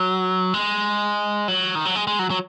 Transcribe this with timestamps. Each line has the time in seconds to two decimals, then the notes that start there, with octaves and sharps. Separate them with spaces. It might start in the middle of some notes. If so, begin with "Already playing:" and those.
Already playing: F#3
0.54 G#3
1.48 F#3
1.75 D#3
1.85 F#3
1.95 G#3
2.07 G#3
2.19 F#3
2.30 F#3